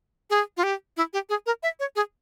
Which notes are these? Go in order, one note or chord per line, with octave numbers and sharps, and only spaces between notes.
G#4
F4
G4
E4
G4
G#4
A#4
E5
C#5
G#4